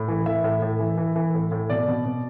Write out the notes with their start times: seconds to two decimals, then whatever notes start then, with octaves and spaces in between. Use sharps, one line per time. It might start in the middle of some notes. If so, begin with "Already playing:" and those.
Already playing: A2
0.08 E3
0.26 E3 E5
0.44 A2
0.62 A2
0.79 E3
0.97 E3
1.16 E3
1.34 A2
1.52 A2
1.70 B2 D5
1.88 B2
2.05 B2